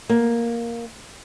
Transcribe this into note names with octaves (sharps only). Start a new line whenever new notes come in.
A#3